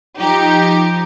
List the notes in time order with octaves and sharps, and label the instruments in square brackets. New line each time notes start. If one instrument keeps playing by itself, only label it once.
[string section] F3 D#4 G4